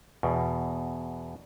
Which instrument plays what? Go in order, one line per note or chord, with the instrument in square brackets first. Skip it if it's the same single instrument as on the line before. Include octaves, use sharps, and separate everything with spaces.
[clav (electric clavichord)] E2 B2